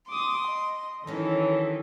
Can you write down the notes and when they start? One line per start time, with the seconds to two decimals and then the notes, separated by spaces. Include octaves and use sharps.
0.10 C6 D6 D#6
0.48 D#5
1.07 D#3 E3 F#3 C#4 D#4 A4